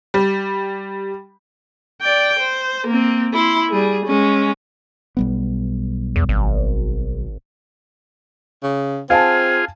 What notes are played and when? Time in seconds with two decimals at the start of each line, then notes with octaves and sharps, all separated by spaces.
0.14 G3
2.02 D5 G5
2.39 C5
2.87 A#3 C4
3.33 E4 C6
3.71 G3 G#4
4.05 G#3 C#4
5.17 B1 G3 B3
6.16 E2
6.29 G#1
8.63 C#3
9.10 C4 F4 G#4 F5 G#5 A5